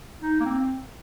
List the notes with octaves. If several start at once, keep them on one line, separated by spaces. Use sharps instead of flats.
D#4
A#3
C4